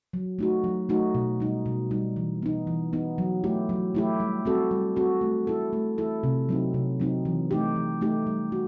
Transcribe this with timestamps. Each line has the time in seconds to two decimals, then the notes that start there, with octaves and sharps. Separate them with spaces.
0.13 F#3
0.39 A3 D#4 F#4
0.64 F#3
0.89 A3 D#4 F#4
1.15 B2
1.40 G3 D#4
1.66 B2
1.91 G3 D#4
2.16 E3
2.42 B3 D#4
2.67 E3
2.93 B3 D#4
3.18 F#3
3.44 A3 E4 G4
3.69 F#3
3.95 A3 E4 G4
4.20 G3
4.45 C4 F#4 A4
4.71 G3
4.96 C4 F#4 A4
5.21 A3
5.47 E4 A4
5.73 A3
5.98 E4 A4
6.23 C3
6.49 F#3 C4 D#4
6.74 C3
7.00 F#3 C4 D#4
7.25 E3
7.51 A3 D#4 G4
7.76 E3
8.01 A3 D#4 G4
8.27 G3
8.52 F#4